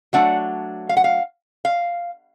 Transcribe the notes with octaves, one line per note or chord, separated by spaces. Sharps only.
F#3 A3 D4 F#5
F5
F#5
F5
F5